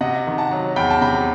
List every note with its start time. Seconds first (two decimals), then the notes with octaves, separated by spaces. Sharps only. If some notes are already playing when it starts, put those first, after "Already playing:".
0.01 C3 D#5 F#5
0.27 D#3
0.38 F#5 A5
0.51 F#3
0.76 E2 G5 B5
0.90 A5
1.01 C3 G5 B5